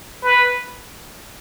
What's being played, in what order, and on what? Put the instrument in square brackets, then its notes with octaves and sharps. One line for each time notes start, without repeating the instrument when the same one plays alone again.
[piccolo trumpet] B4